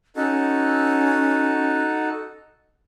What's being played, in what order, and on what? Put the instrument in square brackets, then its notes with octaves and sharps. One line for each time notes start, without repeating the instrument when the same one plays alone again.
[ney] C#4 [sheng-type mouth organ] D#4 F#4 A4